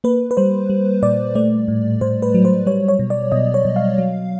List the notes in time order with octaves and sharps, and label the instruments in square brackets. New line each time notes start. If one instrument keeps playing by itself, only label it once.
[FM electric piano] A#3 B4
B4
G3 C5
G3
A#2 D5
A3 D5
A2
A2 C5
B4
F#3
C5
G3 C#5
C#5
B2
D5
B2 D#5
C#5
B2
F5
F#3